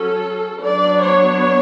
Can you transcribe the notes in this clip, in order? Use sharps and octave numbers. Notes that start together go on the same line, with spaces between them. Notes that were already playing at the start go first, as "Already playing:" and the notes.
Already playing: F#3 C#4 A4
F#3 B3 D4 D5
C#5